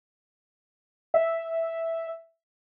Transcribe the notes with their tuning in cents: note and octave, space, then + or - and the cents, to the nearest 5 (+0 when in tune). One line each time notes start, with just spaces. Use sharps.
E5 +0